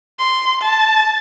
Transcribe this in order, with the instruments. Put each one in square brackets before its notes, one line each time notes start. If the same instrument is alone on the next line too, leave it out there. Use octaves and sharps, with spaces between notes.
[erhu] C6
A5